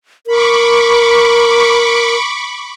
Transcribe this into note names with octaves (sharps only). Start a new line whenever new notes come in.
A#4 B5 C#6 D6